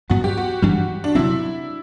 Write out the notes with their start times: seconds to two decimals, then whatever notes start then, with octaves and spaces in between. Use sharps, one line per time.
0.10 G2 F#3 B3 F#4
0.24 G4
0.38 F#4
0.62 G2 E3 G3 D4
1.04 D4
1.15 C3 F#3 C4 E4